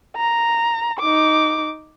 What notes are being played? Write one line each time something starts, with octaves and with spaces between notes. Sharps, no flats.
A#5
D#4 D6